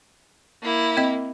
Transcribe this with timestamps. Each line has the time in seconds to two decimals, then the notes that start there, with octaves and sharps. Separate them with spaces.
0.62 A#3 E4
0.97 C4 D#5